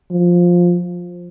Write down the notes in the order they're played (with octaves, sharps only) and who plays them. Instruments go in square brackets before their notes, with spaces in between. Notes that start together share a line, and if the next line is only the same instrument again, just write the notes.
[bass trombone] F3